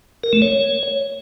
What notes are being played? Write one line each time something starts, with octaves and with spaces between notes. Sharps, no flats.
A#4
A3
C#5